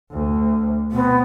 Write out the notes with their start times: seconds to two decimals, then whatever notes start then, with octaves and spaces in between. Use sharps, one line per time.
0.11 D2
0.92 B2 B3 C4